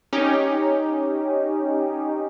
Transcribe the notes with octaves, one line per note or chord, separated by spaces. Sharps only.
C#4 D#4 G4